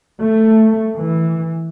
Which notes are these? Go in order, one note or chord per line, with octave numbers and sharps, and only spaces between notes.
A3
E3